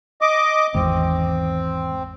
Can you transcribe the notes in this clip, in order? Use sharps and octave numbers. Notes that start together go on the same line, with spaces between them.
D#5 D6
G#1 E2 G#2 C4